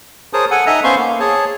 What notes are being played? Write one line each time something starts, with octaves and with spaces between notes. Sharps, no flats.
G#4 A#4 C5 C#5 A5 D#6
A4 F#5 G#5
D#4 A4 D#5 E5 G#5 A#5
B3 C#4 C5 F5 C6 C#6
A#3
G#4 C#5 A5